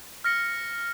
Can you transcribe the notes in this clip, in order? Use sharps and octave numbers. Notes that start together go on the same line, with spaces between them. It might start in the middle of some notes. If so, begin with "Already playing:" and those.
F6 A#6 C#7 G7